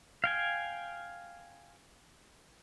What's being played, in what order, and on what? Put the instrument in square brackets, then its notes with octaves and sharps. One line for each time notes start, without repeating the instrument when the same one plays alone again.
[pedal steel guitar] F5 G5 G#5